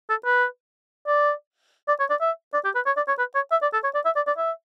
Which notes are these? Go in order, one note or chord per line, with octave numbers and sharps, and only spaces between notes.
A4
B4
D5
D5
C#5
D5
E5
D5
G4
B4
C#5
D5
C#5
B4
C#5
E5
D5
A4
C#5
D5
E5
D5
D5
E5